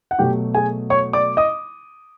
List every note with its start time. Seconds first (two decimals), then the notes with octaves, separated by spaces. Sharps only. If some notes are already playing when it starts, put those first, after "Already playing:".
0.11 F#5
0.19 B2 F#3 A3 G4 G5
0.55 G#4 G#5
0.90 C#5 C#6
1.13 D5 D6
1.37 D#5 D#6